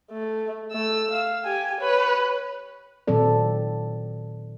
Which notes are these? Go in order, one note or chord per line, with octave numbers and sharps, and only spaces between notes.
A3
A3 E6
F5
G4 G#5
B4 C#5
A#2 D#3 F#3 C4 A4 D5